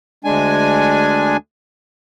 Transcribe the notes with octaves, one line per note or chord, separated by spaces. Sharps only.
D2 G#3 D4 G#5